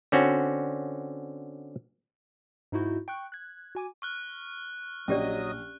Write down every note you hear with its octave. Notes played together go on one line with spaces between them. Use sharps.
D3 C4 C#4 F#4
G#2 D#4 E4 F#4 G6
G5 C#6 F#6
F#6 G#6
F#4 G#5 D6
C#6 F6 F#6
A#1 F#3 C#4 G4 D5 D#5 D#6